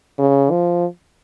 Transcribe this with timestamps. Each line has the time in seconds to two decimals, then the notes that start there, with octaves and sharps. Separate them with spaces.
0.18 C#3
0.51 F3